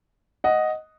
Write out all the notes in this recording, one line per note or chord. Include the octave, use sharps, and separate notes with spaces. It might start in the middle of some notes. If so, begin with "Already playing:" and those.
D#5 F#5